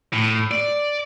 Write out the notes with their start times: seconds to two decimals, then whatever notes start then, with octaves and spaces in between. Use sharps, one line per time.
0.13 A2
0.51 D5